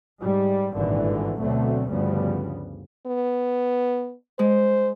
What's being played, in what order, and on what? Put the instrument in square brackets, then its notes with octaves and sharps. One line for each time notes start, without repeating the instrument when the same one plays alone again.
[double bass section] G#2 G3
G#1 G2 A#2 D3 E3
D2 B2 D3 F#3 A3 C4
D2 G2 C#3 F3 G3 B3
[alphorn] B3
[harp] G#3 [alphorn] C5